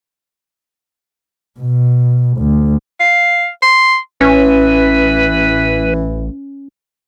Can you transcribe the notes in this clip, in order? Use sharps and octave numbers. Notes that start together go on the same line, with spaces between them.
B2
D2
F5
C6
A1 E3 C#4 B4